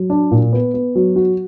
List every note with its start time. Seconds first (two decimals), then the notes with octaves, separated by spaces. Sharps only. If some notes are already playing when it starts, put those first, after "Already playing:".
Already playing: F#3
0.10 D4
0.31 A#2
0.53 B3
0.74 B3
0.95 F#3
1.16 F#4